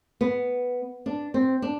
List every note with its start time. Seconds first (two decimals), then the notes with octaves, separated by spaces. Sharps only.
0.21 B3
1.06 D4
1.34 C4
1.62 D4